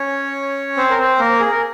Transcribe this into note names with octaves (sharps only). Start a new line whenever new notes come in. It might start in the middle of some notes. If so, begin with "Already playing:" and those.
Already playing: C#4 C#5
C4 C5
A#4
C4 C5
A#3 A#4
G#4
A#4